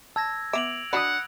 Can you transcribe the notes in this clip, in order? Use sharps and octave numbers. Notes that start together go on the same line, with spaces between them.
A5 E6 G#6 A#6
B3 E5 D6 D7 F7 F#7
D4 F#4 D5 F#5 B5 D#6